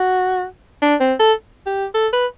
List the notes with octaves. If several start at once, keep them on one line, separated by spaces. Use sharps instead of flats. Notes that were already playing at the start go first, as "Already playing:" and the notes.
Already playing: F#4
D4
C4
A4
G4
A4
B4